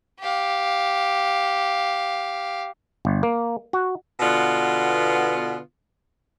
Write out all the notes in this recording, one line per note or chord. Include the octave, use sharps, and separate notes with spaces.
G4 F5
G1
A#3
F#4
B2 D3 B3 F4